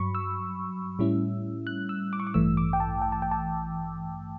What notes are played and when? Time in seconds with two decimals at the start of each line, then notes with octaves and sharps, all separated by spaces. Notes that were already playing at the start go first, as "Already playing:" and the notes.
Already playing: G2 F#3 B5 C#6
0.15 E6
0.99 A2 G3 C#4 E4
1.67 F#6
1.89 E6
2.13 D6
2.20 C#6
2.27 D6
2.34 A1 G2 E3 A3 E6
2.57 D6
2.73 G5
2.80 A5
3.02 G5
3.12 A5
3.22 G5
3.31 A5